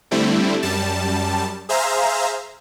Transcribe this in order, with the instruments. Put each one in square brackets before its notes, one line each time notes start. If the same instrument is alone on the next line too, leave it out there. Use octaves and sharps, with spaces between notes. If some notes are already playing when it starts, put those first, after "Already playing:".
[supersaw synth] D3 G3 A3 C4 E4
F#2 G3 A5
G#4 C5 E5 F5 A#5